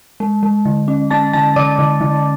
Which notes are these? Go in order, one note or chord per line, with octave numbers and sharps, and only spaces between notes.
G#3
G#3
D3
C#4
C#4 A5 A6
D3 A5 A6
D3 D5 D6
D3
D3